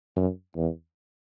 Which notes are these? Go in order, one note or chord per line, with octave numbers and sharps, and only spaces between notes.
F#2
E2